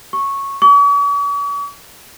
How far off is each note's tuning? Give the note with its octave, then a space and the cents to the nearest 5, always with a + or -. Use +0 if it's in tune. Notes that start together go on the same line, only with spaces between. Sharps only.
C#6 -10
C#6 +45